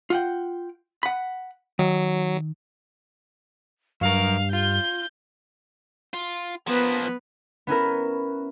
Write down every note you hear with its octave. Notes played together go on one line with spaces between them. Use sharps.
F4 F#5 G5
F#5 B5
D#3 F#3
G2 F#3 A#4 F5
F4 G6 G7
F4
F3 A#3 B3 B4
B3 C#4 E4 A#4